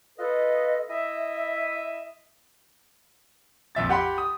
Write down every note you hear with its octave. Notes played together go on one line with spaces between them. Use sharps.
F4 A4 B4 D#5
E4 D#5 E5
A#1 F2 E5 A6
G4 F#5 G5 B5 C6
D#6